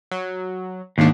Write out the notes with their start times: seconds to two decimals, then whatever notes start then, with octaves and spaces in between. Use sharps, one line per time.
0.11 F#3
0.98 G#1 D#2 G#2 D4